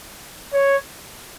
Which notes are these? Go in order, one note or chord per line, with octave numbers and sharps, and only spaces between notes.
C#5